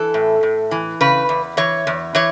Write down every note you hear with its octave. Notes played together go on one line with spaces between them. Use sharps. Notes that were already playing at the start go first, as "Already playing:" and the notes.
Already playing: E3 A4
A2
A2
E3
C#3 B4
E2
E3 C#5
E2
E3 C#5